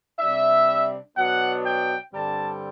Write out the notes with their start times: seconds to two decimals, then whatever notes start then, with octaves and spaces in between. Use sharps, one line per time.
0.19 C3 G3 D4 E5
1.17 B2 F#3 B3 D4 F#5
1.65 G5
2.14 G2 D3 G3 C4 A5